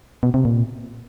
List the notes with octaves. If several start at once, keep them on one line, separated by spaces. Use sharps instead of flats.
B2
C3
A#2